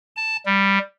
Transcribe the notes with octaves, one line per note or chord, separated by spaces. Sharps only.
A5
G3